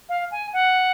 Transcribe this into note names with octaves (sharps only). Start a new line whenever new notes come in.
F5
G#5
F#5